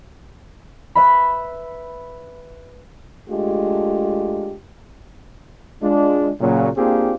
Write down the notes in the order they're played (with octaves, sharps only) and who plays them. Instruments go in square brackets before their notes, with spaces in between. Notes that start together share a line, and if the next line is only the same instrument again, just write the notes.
[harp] B4 E5 B5
[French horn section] G#3 A3 D4 F4 G4
[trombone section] G#3 D4 F4
A#2 C#3 F#3
A#3 C4 D4 F4 G4 G#4